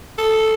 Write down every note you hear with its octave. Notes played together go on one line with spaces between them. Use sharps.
A4